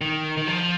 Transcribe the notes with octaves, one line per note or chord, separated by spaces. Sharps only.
D#3
D#3
F3